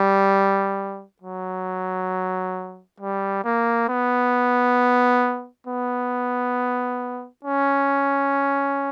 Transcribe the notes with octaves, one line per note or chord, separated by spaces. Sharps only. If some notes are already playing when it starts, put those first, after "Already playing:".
Already playing: G3
F#3
G3
A#3
B3
B3
C#4